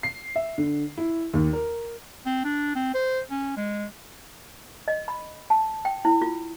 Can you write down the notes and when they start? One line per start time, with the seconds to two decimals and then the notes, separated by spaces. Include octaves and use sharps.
0.03 C7
0.36 E5
0.58 D3
0.97 E4
1.34 D#2
1.53 A#4
2.26 C4
2.44 D4
2.75 C4
2.94 C5
3.30 C#4
3.57 G#3
4.88 D#5
5.08 B5
5.50 A5
5.85 G5
6.05 E4
6.22 F4